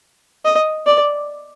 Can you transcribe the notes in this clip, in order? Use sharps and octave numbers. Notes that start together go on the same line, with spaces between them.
D#5
D5